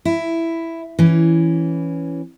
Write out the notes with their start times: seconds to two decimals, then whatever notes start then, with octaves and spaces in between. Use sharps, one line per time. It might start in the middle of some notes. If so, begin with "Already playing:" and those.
0.05 E4
0.99 E3 C#4